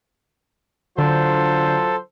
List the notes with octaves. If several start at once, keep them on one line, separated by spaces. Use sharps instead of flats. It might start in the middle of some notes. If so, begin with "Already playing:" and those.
D3 F#3 F4 A4 C5